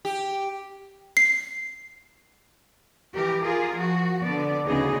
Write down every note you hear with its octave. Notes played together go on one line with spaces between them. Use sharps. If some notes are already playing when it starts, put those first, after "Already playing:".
G4
C7
E3 G4 A#4
F4 G#4 A#4
F3 F#4
D3 B3 D5
D2 C#3 B3 D#4 G#4 D#5